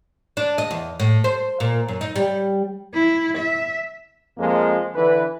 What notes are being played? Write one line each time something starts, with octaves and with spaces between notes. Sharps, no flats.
D4
D#5
E2
A2
C5
A#2
F#2
D#4
G3
E4
E5
F2 F3 G#3 A#3
D3 E3 B4